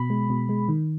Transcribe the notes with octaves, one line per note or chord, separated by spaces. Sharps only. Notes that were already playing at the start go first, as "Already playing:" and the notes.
Already playing: B2 B5
G#3
B2
G#3
D#3